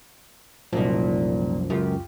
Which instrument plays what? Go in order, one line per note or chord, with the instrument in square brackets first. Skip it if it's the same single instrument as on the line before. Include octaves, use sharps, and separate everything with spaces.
[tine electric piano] C2 F#2 F3 [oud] A#2 D#4
[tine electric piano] C#2 F#2 [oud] C#3 F4 G4